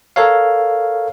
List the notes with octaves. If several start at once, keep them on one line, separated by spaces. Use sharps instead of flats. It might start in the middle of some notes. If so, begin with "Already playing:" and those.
A4 A#4 C#5 F5